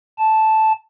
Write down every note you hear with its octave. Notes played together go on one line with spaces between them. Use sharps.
A5